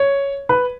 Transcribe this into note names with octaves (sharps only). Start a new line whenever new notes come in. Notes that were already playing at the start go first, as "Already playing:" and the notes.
Already playing: C#5
B4